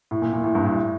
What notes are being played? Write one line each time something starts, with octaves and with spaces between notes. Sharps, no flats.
A2
A#2
A#2
A2
G2
A2